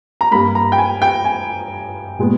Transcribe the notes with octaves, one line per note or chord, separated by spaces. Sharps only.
A#5
G2 G3 A#3 B5
A#5
G5
G#5
G5
G#5
A#2 G#3 B3